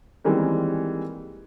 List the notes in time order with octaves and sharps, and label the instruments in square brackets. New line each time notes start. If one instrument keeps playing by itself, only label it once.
[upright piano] D#3 E3 G3 G#3 A#3 C4